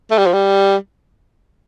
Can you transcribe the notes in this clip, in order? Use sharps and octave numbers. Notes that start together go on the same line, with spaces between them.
A3
G3
F3
G3